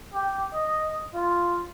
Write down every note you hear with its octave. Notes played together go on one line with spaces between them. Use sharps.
G4
D#5
F4